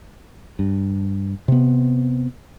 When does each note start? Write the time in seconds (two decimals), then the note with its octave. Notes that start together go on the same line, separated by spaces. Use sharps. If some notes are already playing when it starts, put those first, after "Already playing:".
0.59 G2
1.48 C3 B3